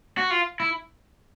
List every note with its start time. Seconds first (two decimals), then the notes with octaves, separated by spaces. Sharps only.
0.18 F#4
0.31 F4
0.60 E4